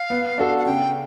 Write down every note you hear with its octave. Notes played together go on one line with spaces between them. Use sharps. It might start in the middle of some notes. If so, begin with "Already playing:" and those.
Already playing: F5
B3
D4 F#4 A4
F#5
C#3 G5